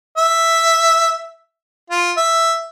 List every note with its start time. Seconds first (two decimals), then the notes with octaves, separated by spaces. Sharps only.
0.17 E5
1.90 F4
2.17 E5